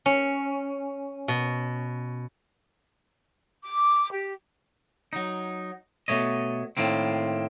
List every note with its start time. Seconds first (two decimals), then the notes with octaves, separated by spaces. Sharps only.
0.06 C#4
1.28 B2
3.63 D6
4.12 G4
5.13 F#3 D#4
6.08 B2 F3 A3 C#5 D#5
6.77 A2 D#3 A#3 C4